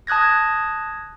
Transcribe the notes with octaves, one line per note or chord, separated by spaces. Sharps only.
A5 D#6 F#6 G#6 A#6